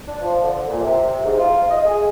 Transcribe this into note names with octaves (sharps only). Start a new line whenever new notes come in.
D4
F3
D3
A#2
C3
G#2
F4
D#5
G#4